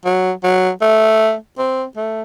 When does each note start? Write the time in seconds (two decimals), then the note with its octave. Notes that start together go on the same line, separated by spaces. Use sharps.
0.05 F#3
0.44 F#3
0.82 A3
1.58 C4
1.96 A3